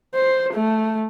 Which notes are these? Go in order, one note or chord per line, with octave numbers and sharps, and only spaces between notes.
C5
A3